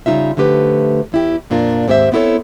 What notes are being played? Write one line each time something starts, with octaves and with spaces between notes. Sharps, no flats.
C#3 G3 G#3 D#4 F4 E5
D3 F3 A3 G4 B4
E2 E4 G4
F2 A#2 D4 F4 A#4
D#2 G#2 C4 G4 C5 E5
B3 C4 E4 G4 A4 C#5